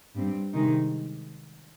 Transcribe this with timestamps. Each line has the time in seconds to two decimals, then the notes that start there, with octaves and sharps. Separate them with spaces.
0.15 G2 G3 C4
0.53 C3 D#3 G#3 D#4